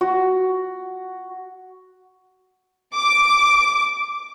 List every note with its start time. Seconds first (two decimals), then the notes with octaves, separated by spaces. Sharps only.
0.01 F#4
2.97 D6